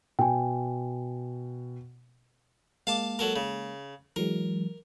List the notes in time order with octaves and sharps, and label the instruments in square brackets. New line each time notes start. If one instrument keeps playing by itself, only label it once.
[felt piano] B2 [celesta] G5 G#5
[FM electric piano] G#3 A#3 [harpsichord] F5 A5 D6
[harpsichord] F#3 A4 A#4
C#3
[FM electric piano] E3 F#3 G#3 [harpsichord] A#4